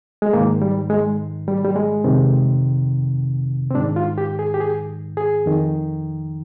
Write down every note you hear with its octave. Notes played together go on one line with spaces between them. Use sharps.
G#3
G#2 D#3 A#3
G3
G#3
G3
G3
G#3
F2 C3 D#3
C4
G#2 D#3 D4
F4
G4
G#4
G4
G#4
G#4
F2 D#3